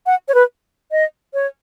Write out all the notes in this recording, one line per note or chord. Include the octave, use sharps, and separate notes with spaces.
F#5
C#5
B4
D#5
C#5